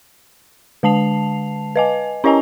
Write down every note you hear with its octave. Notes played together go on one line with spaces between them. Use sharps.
D3 G#3 A5 C7 F7
B4 D#5 G#5
C#4 E4 C#5 D#5 G#5 A#5